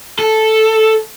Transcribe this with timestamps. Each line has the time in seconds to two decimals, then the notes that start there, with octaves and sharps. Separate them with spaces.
0.19 A4